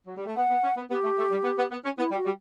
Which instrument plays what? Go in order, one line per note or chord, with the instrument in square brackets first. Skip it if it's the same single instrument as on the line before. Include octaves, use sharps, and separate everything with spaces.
[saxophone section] F#3
G3
A3
[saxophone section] B3 [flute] F#5
[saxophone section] B3
C#4
B3
[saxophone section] B3 [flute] G4
[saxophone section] A3
A3
G3
B3
B3
B3
C#4
[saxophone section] B3 [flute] E4
[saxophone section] G3
[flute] F#4
[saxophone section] G3